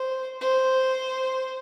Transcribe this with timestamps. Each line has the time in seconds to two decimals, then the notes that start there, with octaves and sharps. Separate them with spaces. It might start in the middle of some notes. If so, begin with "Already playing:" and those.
Already playing: C5
0.41 C5